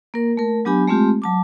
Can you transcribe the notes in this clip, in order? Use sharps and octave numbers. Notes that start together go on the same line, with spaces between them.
A#3 A#4
A3 A#4
F#3 B3 D4 G4 G#5 B5
G#3 A3 C4 F4 G4
F#3 A5 D6